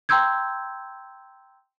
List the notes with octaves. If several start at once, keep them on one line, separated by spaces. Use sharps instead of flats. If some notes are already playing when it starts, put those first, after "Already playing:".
G5 A#5 C6 E6 G6 G#6